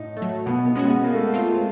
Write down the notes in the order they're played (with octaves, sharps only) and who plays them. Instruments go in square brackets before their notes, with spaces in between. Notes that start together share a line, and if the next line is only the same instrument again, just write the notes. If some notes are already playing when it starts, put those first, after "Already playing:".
Already playing: [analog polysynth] A2 [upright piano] D#4
[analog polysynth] A3
F#3
[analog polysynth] B2 [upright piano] B3
[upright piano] B3
[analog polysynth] G#3 C#4 F#4
[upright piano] B3
[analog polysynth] G#3 [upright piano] A#3
[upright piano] A3
A#3
[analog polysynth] C4 F4